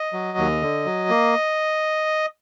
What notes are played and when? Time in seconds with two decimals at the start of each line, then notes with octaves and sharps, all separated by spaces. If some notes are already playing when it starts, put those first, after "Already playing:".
Already playing: D#5
0.13 F#3
0.38 D#2
0.62 D3
0.86 F#3
1.10 A#3